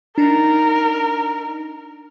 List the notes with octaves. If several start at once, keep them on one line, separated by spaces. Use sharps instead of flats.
D4 D#4 A#4